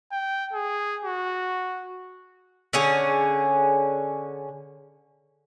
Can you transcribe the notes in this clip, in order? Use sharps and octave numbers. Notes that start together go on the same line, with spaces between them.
G5
G#4
F#4
D3 C#4 G#4